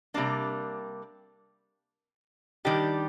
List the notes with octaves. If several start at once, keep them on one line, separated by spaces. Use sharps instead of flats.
C3 G3 A#3 D4
D#3 G3 D4 G4